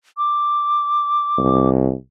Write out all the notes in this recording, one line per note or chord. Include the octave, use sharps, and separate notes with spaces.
D6
C2